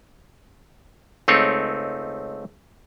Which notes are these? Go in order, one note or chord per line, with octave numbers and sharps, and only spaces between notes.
C#2 A3 C4 D#4 C#5